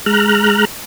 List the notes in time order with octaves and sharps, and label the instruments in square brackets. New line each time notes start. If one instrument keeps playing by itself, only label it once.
[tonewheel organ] G#3 A#5 F6 F#6